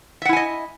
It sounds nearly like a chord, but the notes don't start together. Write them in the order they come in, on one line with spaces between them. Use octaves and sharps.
E5 F#5 E4 G#5 D#5